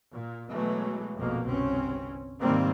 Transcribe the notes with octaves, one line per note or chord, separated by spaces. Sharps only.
A#2
B2 E3 F#3 G#3 A3
A#1 F2 B2 A#3
G1 C2 C4 C#4
G#2 C3 D#3 G3 A#3 C4